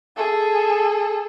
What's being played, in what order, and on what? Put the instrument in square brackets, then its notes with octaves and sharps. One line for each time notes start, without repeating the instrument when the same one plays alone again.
[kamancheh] G#4 A4